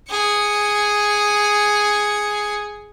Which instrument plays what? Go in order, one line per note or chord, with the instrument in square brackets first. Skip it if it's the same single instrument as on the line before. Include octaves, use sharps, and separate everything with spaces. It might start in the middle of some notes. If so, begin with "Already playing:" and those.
[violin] G#4 C#7